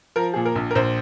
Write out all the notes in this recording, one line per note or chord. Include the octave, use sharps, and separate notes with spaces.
F3 A#4
A#2 G#4
A#4
A#1
A#4
A#1 C5